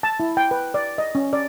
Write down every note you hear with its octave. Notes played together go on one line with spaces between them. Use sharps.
A5
E4
G5
B4
D5
D#5
C#4
D5